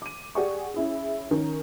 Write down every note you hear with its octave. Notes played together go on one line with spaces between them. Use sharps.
D6 D#7
G4 G#4 D5 F#5 G#5 C#6
C#4 E4 G#4
D#3 C#4 A#4